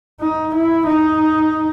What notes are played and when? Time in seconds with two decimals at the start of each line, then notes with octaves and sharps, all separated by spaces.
0.21 D#4
0.54 E4
0.86 D#4